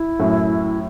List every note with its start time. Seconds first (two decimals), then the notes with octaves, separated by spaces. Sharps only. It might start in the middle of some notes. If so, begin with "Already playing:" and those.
Already playing: E4
0.19 F#2 A2